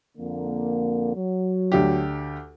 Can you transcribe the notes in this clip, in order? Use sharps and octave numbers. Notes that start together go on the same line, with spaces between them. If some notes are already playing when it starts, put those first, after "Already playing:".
F2 D3 A#3
F#3
D2 D4 G4